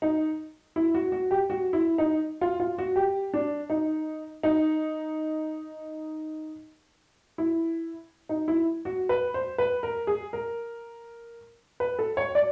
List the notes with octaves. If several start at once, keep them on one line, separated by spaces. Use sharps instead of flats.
D#4
E4
F#4
F#4
G4
F#4
E4
D#4
F4
F4
F#4
G4
D4
D#4
D#4
E4
D#4
E4
F#4
B4
C5
B4
A#4
G#4
A#4
B4
A4
C#5
D5